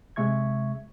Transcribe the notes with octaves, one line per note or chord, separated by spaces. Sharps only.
C3 G#3 E5 C#6 G#6